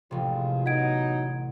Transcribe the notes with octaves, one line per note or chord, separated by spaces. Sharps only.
A1 C3 F3 G#3 F4
F#3 B3 D#4 F#5 G#6 D7